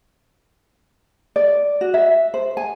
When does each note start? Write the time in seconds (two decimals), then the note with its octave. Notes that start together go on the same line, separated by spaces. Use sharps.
1.36 D5
1.81 F#4
1.94 E5
2.34 C5
2.57 G#5